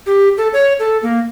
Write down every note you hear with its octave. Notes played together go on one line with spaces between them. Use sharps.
G4
A4
C#5
A4
A#3